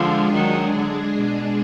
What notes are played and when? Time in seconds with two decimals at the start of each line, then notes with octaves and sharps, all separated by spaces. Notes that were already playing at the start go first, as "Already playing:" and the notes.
Already playing: D3 F3 G#3 D4 F4 G#4
0.33 D#3 F#3 G#3 D4 G#4
0.75 D3
1.17 B2